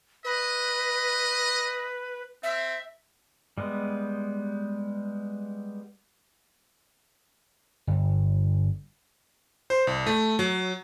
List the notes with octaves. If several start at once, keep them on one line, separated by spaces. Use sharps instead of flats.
B4 D#5
C4 E5
G3 G#3 B3
G1
C5
C2
A3
F#3